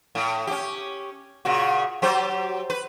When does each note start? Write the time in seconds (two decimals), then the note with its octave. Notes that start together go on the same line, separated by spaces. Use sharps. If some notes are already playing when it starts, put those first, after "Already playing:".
0.15 A2
0.47 C#4 G4
1.45 A#2 C#3 F#4
2.02 F#3 G4 C5
2.70 B4